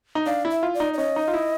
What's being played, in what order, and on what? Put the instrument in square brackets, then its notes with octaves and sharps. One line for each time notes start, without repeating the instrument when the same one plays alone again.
[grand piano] D#4
[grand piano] D4 [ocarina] F5
[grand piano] E4
[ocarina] E5
[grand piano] F4
[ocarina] D5
[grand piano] D#4
[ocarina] D5
[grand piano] C#4 [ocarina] D#5
[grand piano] D#4
F4
E4